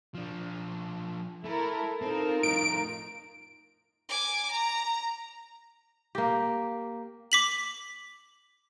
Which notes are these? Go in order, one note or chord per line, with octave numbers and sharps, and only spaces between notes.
F3 D4
A3 E4 A4 A#4
C4 D#4 F4 A#4
F2 A2 D7
G#5 D6
A#5
A#3 G4
D6 B6 F#7